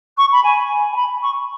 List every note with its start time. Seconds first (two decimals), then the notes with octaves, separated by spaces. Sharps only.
0.17 C#6
0.32 B5
0.43 G#5
0.92 G#5
0.96 B5
1.22 C#6